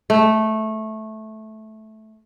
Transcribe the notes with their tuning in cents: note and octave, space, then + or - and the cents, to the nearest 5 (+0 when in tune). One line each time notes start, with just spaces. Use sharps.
A3 -10